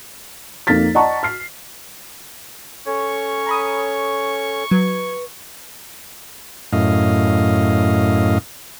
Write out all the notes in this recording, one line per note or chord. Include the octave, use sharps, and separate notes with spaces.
F2 A#3 D#4 F6 A6 B6
D5 D#5 F#5 A5 A#5 C#6
F6 C7
C#4 A4 C#5 C#6
A#5 B5 D#6
F#3 B4 G#6
F#2 A2 D#5 F5